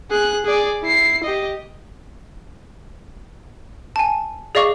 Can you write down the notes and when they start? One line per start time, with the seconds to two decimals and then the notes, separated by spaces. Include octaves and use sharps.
0.10 G#4 F#6
0.45 G#4 D5
0.83 E4 C7
1.23 G4 D#5
3.96 G#5 A5
4.55 G#4 D5 D#5 F5 C#6 D6